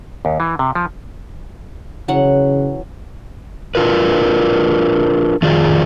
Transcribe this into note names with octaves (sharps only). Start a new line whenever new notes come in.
D#2
E3
C3
F3
C#3 E3 F#3 F#5
D4 F4 A#4 B4
F2 D#3 F4 G#4 D5